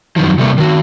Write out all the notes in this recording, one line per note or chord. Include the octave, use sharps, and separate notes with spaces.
F#2 D#3 F3
C3 G3 A3 A#3
D#3 F#4